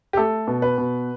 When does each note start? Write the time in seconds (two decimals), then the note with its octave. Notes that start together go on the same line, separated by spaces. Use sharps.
0.13 G4
0.17 A3 A4
0.47 B2
0.62 B4
0.78 B2